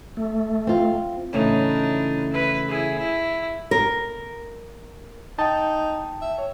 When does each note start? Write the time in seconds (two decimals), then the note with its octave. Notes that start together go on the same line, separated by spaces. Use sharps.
0.17 A3
0.67 C4 F4
1.33 A2 C#3 E3 D4 D#4
2.31 E4 B4
2.68 E4 G#4
2.99 E4
3.71 A#4
5.39 D#4 G5 A5
6.22 E5
6.38 C#5